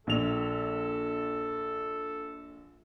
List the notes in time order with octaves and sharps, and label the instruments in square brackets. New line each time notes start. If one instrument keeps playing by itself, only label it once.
[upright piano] A#1 F7 [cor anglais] A4